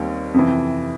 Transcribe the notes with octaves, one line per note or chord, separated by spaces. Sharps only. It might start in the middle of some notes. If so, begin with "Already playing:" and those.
Already playing: D#2 D#3 G3 C4
F2 C3 E3